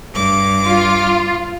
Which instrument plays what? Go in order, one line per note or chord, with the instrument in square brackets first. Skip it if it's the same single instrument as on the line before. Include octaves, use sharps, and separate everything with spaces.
[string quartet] G2 D6
[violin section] F4